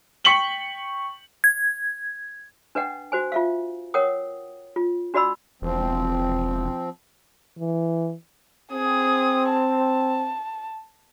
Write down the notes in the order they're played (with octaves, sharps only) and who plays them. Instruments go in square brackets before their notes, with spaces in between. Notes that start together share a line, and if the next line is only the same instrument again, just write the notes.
[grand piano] G5 C#6 B6 C#7 F#7 G7
[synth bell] G#6
[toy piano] D4 B4 D#5 F#5 G5
F#4 C5 G#5
F4 E5 F5
A#4 C#5 F#5 G5 D#6
F4
D4 F#4 D5 D#5 B5 E6
[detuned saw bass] E1 [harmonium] F3 C4
[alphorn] E3
[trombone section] C4 [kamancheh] G#4 D#6
[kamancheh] A5